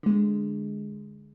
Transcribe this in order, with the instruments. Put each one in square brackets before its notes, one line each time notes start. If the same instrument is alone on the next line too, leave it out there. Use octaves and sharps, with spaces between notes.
[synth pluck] D3 G#3